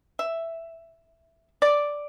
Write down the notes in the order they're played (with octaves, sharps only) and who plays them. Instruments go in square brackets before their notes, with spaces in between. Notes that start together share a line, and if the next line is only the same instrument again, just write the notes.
[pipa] E5
D5